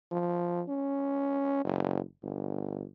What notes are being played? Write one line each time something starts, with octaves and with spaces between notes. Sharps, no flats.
F3
C#4
F#1
G1